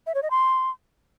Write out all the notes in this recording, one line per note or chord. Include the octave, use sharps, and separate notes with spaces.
E5
C#5
D#5
C6